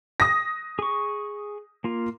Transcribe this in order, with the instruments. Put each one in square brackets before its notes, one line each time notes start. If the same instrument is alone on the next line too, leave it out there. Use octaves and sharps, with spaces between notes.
[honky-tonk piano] D#6 A#6
[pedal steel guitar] G#4 C#6
A#3 F4